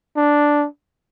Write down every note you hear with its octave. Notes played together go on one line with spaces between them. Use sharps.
D4